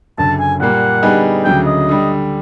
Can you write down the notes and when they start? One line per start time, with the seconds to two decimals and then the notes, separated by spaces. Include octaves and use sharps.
0.18 F#1 F#2 D3 A5
0.40 G#5
0.60 A#2 G3 A#3 F#5
1.02 D3 G3 B3 D#4 G#4
1.44 D2 C#3 F#3 G5
1.66 D#5
1.89 D3 G3